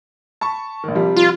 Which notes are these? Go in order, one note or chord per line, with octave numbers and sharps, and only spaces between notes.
A5 B5 C#6
A#1 D#3
C3 F3 G3
F4